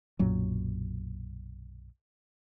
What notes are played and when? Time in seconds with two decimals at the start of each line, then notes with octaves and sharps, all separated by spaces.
0.19 B1 F#2 A#2 F#3